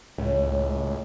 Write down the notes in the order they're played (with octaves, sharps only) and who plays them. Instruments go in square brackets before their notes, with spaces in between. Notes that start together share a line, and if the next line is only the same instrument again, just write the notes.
[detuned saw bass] C#2 [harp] A2